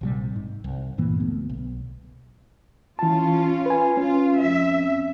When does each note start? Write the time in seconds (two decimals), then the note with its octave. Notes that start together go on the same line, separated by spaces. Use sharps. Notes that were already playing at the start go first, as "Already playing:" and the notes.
0.01 A#1 C3 G3
0.36 G#2
0.64 C2
0.98 G2 A#2 E3 A#3
1.20 D2 B3
1.49 B1
2.99 E3 C#4 F4 A5
3.66 B4 G#5
3.97 C#4 F4
4.38 F2 E5